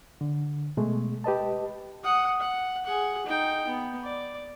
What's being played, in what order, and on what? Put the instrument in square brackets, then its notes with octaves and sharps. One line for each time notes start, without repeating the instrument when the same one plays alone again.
[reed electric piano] D3
B2 G#3 A3
G4 B4 D#5 A5
[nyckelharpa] F#5 D#6
F#5
G#4 F#5
D#4 G5
B3
D5